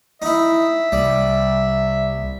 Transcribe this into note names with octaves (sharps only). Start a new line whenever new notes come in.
D#4 E4 E5
C2 G3